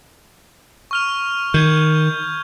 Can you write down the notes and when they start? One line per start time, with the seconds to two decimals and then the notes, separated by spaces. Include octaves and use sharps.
0.91 C#6 F6 F7
1.54 D#3 G6 G#6